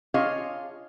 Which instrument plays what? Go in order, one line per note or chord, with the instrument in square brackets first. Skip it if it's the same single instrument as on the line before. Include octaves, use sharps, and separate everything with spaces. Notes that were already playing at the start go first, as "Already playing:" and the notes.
[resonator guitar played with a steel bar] D4 F4 G#4 C#5 D#5 F5